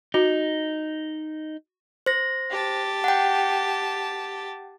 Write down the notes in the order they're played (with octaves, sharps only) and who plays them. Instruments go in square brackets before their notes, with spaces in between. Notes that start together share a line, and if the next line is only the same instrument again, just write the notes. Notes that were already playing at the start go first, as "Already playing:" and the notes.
[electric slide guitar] D#4 [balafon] F#4
[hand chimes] C5 A#6
[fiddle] G4 A5
[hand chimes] F#5 G5